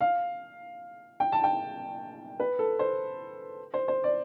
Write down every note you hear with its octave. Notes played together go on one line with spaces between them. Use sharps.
F5
G5
A5
G5
B4
A4
C5
C5
C5
D5